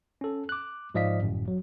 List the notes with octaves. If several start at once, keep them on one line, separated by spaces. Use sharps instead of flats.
C#4 A4
D6 F#6
G#2 F3 D5 D#5 F5 B6
G1 F#2 A2
F#3